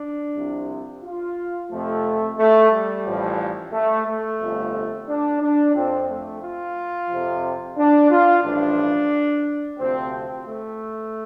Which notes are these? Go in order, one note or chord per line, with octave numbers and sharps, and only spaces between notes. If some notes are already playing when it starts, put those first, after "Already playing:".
Already playing: D4
C2 C3 F3
F4
F2 C3 F3 A3
A3
G3
A1 A2 F3
A3
A3
G1 F2 F3
D4
D4
F2 F3 C4
A3
F4
F2 C3 F3
D4
F4
A1 G2 F3 D4
D2 C3 F3 C4
C4
A3